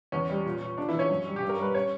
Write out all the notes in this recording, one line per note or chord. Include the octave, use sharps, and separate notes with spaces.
E2 C#4
G3
A#2
A#2
A#2 D4
E3 E4
A#2
C#4 C#5
F#2
G3
G4
G2
A#4
G3 B4
C#4 C#5